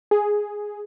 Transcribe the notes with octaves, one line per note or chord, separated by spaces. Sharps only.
G#4